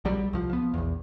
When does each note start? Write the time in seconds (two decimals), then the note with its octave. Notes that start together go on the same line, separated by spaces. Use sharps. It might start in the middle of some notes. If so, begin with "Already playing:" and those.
0.05 A#1 F#3 G3
0.33 C2 F3
0.50 F3 B3
0.74 A#1 E2